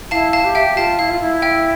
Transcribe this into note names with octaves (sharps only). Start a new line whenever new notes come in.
E4 F5 A5
F5 A5
G4
E5 G5
F4 F5 A5
E4 F5
F4
E4
E5 G5